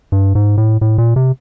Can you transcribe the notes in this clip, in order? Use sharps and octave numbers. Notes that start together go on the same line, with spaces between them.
G2
G#2
A2
A2
A#2
C3